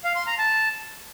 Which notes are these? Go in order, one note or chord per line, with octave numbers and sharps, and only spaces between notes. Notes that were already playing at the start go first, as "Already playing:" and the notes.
F5
C6
A#5
A5